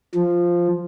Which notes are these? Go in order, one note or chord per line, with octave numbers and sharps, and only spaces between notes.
F3